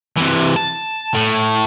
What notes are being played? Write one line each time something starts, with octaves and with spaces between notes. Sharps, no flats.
C3 E3
A5
A2